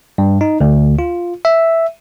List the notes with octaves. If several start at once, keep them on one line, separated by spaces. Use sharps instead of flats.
G2
D#4
D2
F4
E5